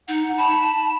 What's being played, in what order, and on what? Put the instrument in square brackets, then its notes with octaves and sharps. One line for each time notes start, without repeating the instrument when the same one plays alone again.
[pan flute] D#4 [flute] F#5
[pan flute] A5 [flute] B5